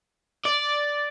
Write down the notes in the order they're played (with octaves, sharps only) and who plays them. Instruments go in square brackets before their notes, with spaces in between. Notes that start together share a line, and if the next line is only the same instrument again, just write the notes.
[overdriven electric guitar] D5